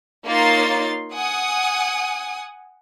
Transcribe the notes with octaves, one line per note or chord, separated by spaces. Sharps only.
A#3 D#4 F4 C#5 C6 A6
F#5 G#5 D#6